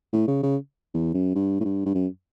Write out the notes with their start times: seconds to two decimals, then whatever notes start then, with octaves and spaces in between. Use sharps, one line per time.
0.13 A2
0.28 C#3
0.43 C#3
0.94 E2
1.14 F#2
1.35 G2
1.60 A2
1.64 G2
1.86 G2
1.95 F#2